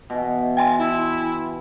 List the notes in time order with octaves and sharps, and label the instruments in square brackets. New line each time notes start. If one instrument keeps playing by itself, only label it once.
[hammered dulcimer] B2 E3
[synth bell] G5 G#5 C6
[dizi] E4